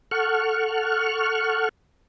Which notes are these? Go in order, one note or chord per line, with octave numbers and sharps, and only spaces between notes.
A4 F#5 C#6 F6